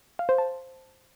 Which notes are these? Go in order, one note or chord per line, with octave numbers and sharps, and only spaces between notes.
F5
C5
A5